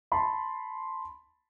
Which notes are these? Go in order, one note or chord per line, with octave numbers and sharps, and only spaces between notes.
A5 B5 C6